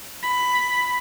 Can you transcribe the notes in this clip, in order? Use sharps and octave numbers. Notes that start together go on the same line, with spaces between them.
B5